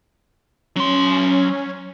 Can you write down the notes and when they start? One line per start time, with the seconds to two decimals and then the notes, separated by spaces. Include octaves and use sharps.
0.76 F#3 C#4 C6